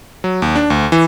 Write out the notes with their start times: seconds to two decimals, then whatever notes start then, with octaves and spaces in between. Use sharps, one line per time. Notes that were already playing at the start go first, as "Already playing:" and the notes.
0.24 F#3
0.42 D#2
0.56 D4
0.70 D2
0.92 E3